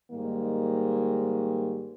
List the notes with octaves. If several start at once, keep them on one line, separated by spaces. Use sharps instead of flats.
G#2 D#3 G3 A#3